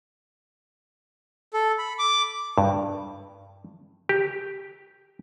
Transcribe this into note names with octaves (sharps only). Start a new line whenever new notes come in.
A4
B5
D6
G2
G4